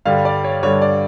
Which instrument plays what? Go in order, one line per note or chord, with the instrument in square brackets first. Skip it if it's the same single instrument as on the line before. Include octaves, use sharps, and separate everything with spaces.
[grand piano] G2 D3 G3 F5
D5
C#5
G2 D3 G3 C#5
D5